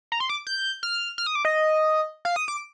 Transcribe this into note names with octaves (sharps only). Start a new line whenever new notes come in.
A#5
C6
D6
G6
F6
F6
D#6
D6
D#5
F5
D#6
D6